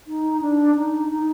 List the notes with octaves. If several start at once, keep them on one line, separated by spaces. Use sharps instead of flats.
D#4
D4
D#4
D#4